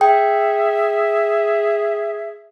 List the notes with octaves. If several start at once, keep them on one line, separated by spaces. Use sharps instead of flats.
G#4 E5 G5